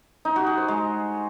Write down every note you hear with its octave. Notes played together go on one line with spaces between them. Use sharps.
D#4
F#4
G#4
C5
G#3